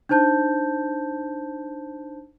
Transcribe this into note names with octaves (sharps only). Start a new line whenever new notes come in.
D4 D#4 C5 A5 G6